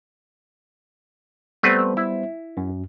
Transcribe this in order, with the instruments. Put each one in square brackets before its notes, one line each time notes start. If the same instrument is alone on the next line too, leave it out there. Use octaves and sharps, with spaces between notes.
[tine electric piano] G3 B3 C5 [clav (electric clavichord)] A3 C4 B4
[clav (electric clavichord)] E4
[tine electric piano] F#2